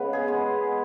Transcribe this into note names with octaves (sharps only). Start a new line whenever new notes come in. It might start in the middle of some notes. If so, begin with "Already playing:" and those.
Already playing: C#3 G#3 B3 B4
G#4
G#3 B3